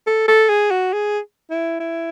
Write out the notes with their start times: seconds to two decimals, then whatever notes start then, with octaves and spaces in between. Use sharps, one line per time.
0.07 A4
0.28 A4
0.49 G#4
0.71 F#4
0.93 G#4
1.51 E4
1.80 E4